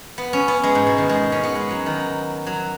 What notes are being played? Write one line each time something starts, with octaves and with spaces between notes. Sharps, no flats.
B3
C#4
B3
G#3
G#2
B2
D#3
G#3
C#4
B3
G#3
F#3
D#3
F#3